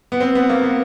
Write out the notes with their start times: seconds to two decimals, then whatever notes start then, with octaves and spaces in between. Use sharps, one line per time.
0.12 B3
0.20 C4
0.35 B3
0.49 A#3
0.63 B3